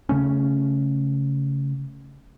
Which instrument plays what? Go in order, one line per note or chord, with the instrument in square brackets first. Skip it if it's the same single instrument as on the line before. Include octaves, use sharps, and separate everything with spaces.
[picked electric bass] C#3 A3 C#4